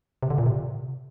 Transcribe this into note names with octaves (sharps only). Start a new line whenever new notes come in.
C3
D3
A#2
C3